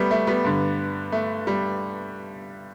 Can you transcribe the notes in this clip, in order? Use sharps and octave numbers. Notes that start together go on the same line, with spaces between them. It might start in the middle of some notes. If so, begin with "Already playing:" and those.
Already playing: G3 A3 B3
A3
G3 B3
G2 D3
A3
G3